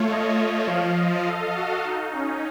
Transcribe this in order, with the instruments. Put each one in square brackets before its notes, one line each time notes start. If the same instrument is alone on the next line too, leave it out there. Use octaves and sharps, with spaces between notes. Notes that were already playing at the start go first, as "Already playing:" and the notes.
Already playing: [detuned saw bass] A3 [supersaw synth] F4 C#5
[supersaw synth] D#5
[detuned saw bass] F3 [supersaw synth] F5
[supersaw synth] D#5
A4
F#4
D#4
C#4